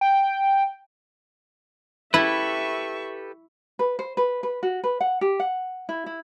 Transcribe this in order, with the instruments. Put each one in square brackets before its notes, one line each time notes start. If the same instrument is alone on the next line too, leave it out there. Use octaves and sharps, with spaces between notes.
[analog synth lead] G5
[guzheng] E4 [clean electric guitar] G4 A4 B4 [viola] E5 C#6
[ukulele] B4
C5
B4
B4
F#4
B4
F#5
G4
F#5
E4
E4